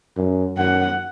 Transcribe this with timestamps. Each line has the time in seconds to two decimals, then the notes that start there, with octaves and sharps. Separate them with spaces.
0.17 F#2
0.57 F#2 F#5